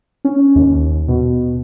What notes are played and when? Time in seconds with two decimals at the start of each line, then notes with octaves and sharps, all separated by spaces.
0.25 C#4
0.55 D#2
1.08 B2